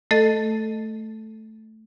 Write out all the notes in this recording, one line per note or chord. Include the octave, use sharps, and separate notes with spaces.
A3 A4 D#5 A6